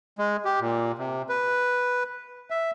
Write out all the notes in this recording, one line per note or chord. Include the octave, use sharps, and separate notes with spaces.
G#3
G4
A#2
C3
B4
E5